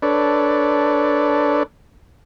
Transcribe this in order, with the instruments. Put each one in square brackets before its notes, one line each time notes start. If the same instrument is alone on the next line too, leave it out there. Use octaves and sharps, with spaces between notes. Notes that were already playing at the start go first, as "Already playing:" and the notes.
[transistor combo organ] D4 A4 B4 C#5 D5